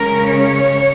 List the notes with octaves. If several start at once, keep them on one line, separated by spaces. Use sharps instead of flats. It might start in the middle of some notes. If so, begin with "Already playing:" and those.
Already playing: C#3 G#3 C#4 A#4
C#5